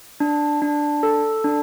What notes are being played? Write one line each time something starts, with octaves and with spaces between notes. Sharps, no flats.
D4
D4
A4
D4